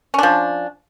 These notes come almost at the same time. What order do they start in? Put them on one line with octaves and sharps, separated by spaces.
C#4 D4 F3